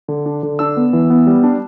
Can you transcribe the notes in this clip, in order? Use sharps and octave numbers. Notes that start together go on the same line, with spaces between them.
D3
D4
D3
D4 E6
B3
E3
B3
G3
D4